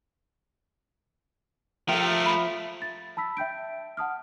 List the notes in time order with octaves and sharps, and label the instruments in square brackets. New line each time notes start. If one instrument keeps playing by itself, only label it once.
[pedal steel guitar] F3 [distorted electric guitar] A3 A#4 [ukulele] A4 G5 [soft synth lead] E5
[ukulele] G4
B5
[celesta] A6
A5 B5 E6 B6
E5 G5 G6 D7
F#5 A5 D#6 F6